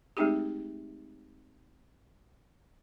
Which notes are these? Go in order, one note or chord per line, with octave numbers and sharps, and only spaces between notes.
G#3 A3 C4 D#4 G4 G#4